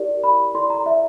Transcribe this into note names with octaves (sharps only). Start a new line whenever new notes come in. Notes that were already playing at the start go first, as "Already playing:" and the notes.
Already playing: E4 G4 A#4 D5
B5
E4 A4 D5 C6
A#5
E5